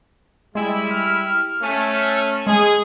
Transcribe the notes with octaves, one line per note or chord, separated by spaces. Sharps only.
G3 G#3 E4
F6
A3 C#4
G#3 G#4